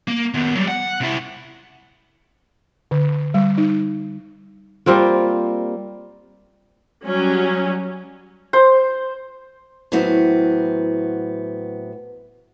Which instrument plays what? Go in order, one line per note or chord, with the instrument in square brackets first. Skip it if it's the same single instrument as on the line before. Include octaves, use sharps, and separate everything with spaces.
[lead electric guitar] A#3
D#3 B3
F#3 G3
F#5
C3 E4
[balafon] D3
G3
D#4
[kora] G3 A#3 C4 F4
[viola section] F#3 G3 C#4
[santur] C5
[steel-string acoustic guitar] A2 E3 F#3 B3 C4